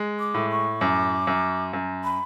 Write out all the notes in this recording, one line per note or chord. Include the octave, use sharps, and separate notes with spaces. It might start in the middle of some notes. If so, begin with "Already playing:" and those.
Already playing: G#3
D6
A2
C#6
F#2 D6
F#2
F#2
B5